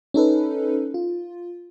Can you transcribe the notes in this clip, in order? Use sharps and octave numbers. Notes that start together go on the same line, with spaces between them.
C#4 D#4 A4 B4
F4